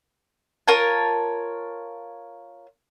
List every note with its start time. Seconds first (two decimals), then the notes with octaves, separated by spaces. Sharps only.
0.68 F4 A#4 C#5 A5